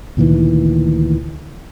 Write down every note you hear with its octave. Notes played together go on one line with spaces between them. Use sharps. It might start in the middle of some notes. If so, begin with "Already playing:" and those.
D2 A#2 D#3 E3